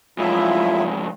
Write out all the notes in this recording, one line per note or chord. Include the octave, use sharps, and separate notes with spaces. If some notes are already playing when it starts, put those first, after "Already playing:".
F2 G#2 F#3 E4 F4 E5